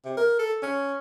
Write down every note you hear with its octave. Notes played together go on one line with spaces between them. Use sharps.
C3
A#4
A4
C#4